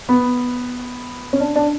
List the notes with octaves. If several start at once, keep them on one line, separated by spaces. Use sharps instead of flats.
B3
C#4
D4
D4